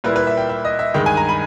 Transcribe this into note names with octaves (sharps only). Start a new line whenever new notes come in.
A#2 G3 A#3 E4 B4
B4
E5
G5
E5
D#5
E5
G2 D#3 G#3 G5
G#5
A#5
B5